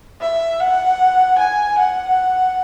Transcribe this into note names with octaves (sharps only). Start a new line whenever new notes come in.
E5
F#5
G#5
F#5